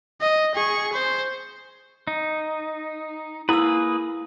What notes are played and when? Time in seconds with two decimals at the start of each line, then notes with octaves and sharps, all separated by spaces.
0.21 D#5
0.55 G#4 C#6
0.93 C5
2.07 D#4
3.49 A#3 E4 G#4 B4 E6